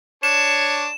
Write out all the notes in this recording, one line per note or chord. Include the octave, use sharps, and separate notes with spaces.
D4 C#5 E7